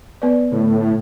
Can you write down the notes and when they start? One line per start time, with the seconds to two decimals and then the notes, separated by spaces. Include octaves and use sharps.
0.22 B3 B4 D5
0.52 A2 D3